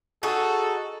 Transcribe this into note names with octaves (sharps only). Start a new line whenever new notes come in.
D#4 F#4 G#4 A4